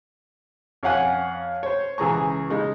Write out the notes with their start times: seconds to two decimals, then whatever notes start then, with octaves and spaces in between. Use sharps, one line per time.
0.83 F2 C#5 F5 F#5 G#5 F#6
1.63 C5 C#5
1.98 C#2 E3 G#4 A#5 C#6
2.50 C#3 G#3 D#4